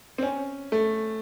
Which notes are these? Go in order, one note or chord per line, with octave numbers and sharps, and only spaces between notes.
C4
C#4
A3